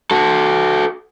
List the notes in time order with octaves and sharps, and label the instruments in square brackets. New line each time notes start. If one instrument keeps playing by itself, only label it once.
[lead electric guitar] F#4 A4